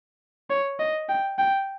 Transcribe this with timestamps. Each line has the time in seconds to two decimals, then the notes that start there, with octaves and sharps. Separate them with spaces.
0.50 C#5
0.80 D#5
1.09 G5
1.39 G5